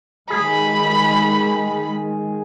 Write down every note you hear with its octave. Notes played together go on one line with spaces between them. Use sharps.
D#3 G#3 G#4 B5